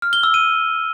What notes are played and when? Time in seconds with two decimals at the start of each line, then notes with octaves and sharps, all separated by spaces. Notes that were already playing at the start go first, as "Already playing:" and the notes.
0.02 F6
0.13 G7
0.23 E6
0.34 D#7